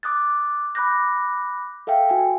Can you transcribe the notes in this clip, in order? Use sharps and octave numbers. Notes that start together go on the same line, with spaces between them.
D6 D#6 F#6 A6
B5 D6 F#6 G6 A#6
A4 E5 F5 G5
F#4 G#5